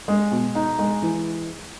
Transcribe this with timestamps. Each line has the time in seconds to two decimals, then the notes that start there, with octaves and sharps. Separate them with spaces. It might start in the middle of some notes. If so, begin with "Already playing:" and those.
0.08 G#3
0.32 B2
0.55 D#4
0.79 G#3
1.02 E3